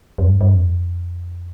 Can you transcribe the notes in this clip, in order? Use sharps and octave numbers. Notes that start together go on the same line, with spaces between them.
F2
G2
G2
F2